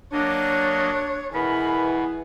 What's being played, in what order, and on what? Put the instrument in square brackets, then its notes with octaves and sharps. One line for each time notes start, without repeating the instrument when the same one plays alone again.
[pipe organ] F#3 A#3 D#5 [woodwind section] D4 [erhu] C#5
[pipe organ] B2 B3 [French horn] E3 [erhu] G#4 [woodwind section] A#4 B5